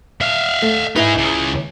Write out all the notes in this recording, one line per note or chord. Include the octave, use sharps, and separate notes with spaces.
E5 F5
A3
D#4 E4 G#4 B4
C#2 C#3